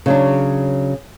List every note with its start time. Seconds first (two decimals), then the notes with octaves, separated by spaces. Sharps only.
0.06 C#3 F#3 D4